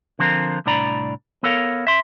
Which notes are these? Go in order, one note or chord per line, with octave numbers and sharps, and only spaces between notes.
D3 F3 C4 F4 A#4
C2 A2 D4 D5 A#5 B5
B3 A4 A#4 C#5 F5
E5 C6